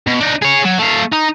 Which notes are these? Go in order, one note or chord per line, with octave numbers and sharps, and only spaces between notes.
B2
D4 D#4
G#4 C#5
F#3
A3 F5
D#4